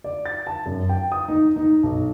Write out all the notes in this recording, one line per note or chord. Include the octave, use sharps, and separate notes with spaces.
D5
A6
A5
F#2
G5
D#6
D#4
D#4
B1